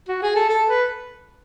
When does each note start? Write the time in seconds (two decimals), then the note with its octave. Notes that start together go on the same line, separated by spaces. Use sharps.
0.08 F#4
0.22 G#4
0.36 A4
0.49 A4
0.69 B4